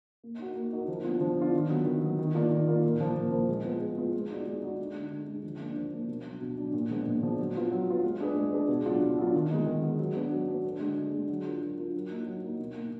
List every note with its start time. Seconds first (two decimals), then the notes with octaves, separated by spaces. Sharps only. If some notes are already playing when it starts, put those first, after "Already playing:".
0.24 A#3
0.39 D#4 F#4 A#4
0.56 A#3
0.73 D#4 F#4 A#4
0.88 F3
1.05 B3 D4 F4
1.21 F3
1.37 B3 D4 F4
1.54 D#3
1.70 F#3 B3
1.86 D#3
2.02 F#3 B3
2.19 D#3
2.34 A#3 F4 A#4 D5
2.51 D#3
2.67 A#3 F4 A#4 D5
2.84 A#2
3.00 F3 A#3
3.16 A#2
3.32 F3 A#3
3.48 G#3
3.64 B3 F4 B4
3.82 G#3
3.97 B3 F4 B4
4.13 G#3
4.30 D#4 F#4 D5
4.46 G#3
4.62 D#4 F#4 D5
4.79 D3
4.95 G#3 D4
5.11 D3
5.28 G#3 D4
5.44 F3
5.60 A#3 D4
5.76 F3
5.93 A#3 D4
6.08 B2
6.25 F#3 D4
6.41 B2
6.58 F#3 D4
6.74 A#2
6.90 F3 G#3 B3 D4
7.07 A#2
7.22 F3 G#3 B3 D4
7.39 F#3
7.55 B3 F4 B4
7.71 F#3
7.88 B3 F4 B4
8.04 G#3
8.20 D4 G#4 B4
8.36 G#3
8.53 D4 G#4 B4
8.68 B2
8.86 F#3 B3 D4 F4
9.02 B2
9.18 F#3 B3 D4 F4
9.34 D#3
9.51 G#3 B3 D#4
9.66 D#3
9.83 G#3 B3 D#4
9.99 F#3
10.15 B3 D4 F#4 B4
10.32 F#3
10.48 B3 D4 F#4 B4
10.64 D3
10.80 G#3 D4 F#4
10.97 D3
11.13 G#3 D4 F#4
11.29 F#3
11.46 D4 F4 A#4
11.62 F#3
11.78 D4 F4 A#4
11.94 F#3
12.10 A#3 D#4
12.26 F#3
12.43 A#3 D#4
12.60 B2
12.75 A#3 D#4